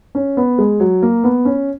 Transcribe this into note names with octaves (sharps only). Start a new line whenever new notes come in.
C#4
B3
G#3
F#3
A#3
B3
C#4